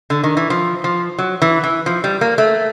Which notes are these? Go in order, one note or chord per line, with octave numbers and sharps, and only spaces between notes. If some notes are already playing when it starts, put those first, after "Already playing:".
D3
D#3
E3
F3
F3
F#3
E3
E3
F3
G3
A#3
A3